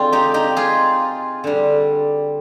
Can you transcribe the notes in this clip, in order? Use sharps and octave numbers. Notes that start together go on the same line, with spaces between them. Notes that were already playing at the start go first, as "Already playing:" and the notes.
Already playing: D3 G#3 C4 F4
D#4 G4
D#4 G4
F4 G#4
D3 G3